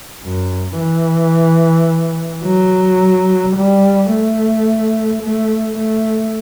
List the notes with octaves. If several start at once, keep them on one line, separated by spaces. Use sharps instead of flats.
F#2
E3
F#3
G3
A3
A3
A3